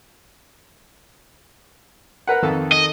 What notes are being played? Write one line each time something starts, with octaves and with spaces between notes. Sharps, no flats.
A#4 B4 F#5
F2 D#3 A4
D#5